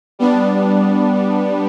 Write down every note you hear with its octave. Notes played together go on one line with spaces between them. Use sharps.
G3 B3 D4